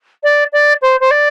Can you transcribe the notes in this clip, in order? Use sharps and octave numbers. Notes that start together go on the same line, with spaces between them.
D5
D5
C5
C5
D5